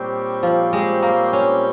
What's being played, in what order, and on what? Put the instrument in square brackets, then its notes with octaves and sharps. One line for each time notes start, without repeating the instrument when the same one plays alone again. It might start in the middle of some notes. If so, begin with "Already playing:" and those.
Already playing: [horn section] A#2 G3 C4 G4 C#5
[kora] F3
G#3
A#3
C#4